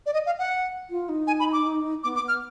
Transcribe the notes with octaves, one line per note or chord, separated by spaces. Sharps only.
D5
D#5
F5
F#5
F4
D#4
G#5
B5
D6
B3 D6
D6
B3
F6